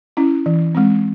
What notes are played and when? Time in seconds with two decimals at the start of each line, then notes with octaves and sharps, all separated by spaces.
0.17 C#4 E4
0.46 E3
0.75 G#3 C4